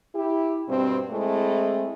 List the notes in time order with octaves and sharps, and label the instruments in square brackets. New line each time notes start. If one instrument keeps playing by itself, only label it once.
[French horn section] E4 G4
G2 B2 C4
G#3 A3 C4 E4